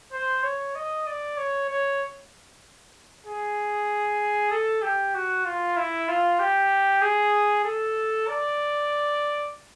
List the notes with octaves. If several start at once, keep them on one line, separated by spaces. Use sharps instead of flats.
C5
C#5
D#5
D5
C#5
C#5
G#4
A4
G4
F#4
F4
E4
F4
G4
G#4
A4
D5